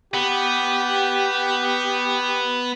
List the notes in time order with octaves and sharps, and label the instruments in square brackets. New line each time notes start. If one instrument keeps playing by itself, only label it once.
[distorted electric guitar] B3 [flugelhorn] G4